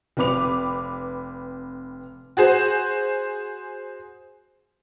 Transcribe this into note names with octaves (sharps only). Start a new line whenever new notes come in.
F1 C4 B4 D6 F7
F#4 G#4 C5